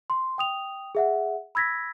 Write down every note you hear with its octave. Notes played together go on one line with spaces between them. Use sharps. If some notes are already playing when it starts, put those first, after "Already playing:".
C6
G5 D#6 F7
G#4 E5 F#5
B5 E6 G#6 A#6 B6